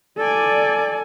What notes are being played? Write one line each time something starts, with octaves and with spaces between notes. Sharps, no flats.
A4 D5 G#5